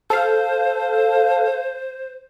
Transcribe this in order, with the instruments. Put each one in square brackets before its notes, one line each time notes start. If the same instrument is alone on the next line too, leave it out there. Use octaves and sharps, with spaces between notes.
[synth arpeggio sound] A4 F5 [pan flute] C5